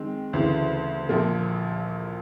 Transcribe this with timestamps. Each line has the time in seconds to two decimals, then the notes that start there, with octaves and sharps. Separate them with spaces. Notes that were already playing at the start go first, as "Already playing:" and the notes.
Already playing: D#3 G#3 C4
0.33 D2 C#3 E3
1.09 A#1 A#2 F3 A#3